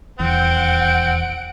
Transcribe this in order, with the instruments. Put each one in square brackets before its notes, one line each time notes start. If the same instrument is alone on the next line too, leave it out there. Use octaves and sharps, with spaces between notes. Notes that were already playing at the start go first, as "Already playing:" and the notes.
[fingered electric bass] D#1 E2 [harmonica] C4 [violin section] F#5 D7